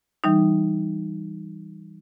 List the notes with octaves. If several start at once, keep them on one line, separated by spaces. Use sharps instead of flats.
E3 G3 D#4